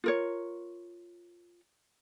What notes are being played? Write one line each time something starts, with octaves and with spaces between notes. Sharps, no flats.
F4 A#4 C#5